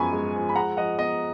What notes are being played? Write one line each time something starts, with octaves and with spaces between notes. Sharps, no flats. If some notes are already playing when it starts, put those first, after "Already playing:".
Already playing: F#2 F3 G#3 B3 G#5 B5 C#6
G#3
F3
B5
G#3 F#5 A#5
F3 D#5 F#5
B3 D#5